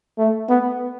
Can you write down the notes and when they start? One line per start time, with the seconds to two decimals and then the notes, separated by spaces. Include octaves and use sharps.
0.18 A3
0.49 B3